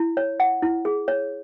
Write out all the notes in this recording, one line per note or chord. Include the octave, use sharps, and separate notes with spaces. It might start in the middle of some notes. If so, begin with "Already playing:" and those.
Already playing: E4
C#5
F#5
E4
G#4
C#5